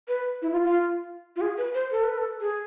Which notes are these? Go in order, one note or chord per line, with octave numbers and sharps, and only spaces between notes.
B4
E4
F4
F4
F4
G#4
B4
C5
A4
B4
A4
G#4